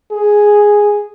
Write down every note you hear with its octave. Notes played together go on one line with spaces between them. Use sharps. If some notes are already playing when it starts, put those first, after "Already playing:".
G#4